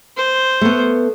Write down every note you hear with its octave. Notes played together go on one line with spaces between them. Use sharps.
C5
A3 B3